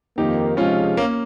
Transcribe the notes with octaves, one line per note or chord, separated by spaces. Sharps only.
F2 D#3 A#3 D#4 G4
C3 F3 G#3 C#4 F4
A#3 C#4